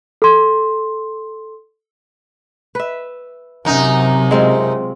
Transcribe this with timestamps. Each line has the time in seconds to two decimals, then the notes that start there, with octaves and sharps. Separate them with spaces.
0.22 A4 C6
2.75 B4 E5
3.65 F#2 C3 F#3 D#4
4.31 G#3 C4 F4